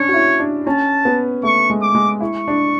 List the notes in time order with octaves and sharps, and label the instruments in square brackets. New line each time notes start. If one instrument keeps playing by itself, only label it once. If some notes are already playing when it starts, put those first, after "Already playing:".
Already playing: [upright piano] C#4 D4 [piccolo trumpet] C#5
[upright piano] F#4
E4
D4
[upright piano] C#4 [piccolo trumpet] A5
[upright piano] B3
[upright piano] A3 [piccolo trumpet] C#6
[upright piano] G#3
[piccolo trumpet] D6
[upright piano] G#3
[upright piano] E4 [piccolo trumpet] C#6
[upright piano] D4